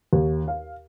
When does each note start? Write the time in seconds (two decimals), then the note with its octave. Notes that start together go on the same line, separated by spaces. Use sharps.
0.13 D#2
0.48 F5